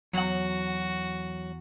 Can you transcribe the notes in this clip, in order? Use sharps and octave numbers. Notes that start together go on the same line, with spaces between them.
E2 F#3 F#4 F#5